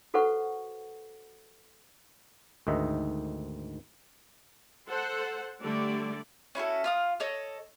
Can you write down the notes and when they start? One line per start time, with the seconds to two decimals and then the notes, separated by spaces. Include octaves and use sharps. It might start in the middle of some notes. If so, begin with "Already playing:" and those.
0.14 F#4 A4 B4 C5 F#5 C#6
2.67 D2 G#2 D#3 D#5 E5
4.88 A4 C5 F#5
5.61 D3 G3 A3 D5
6.55 C#4 E4 F#4 A4
6.84 F4 F5 D#6
7.20 A4 C#5 D#5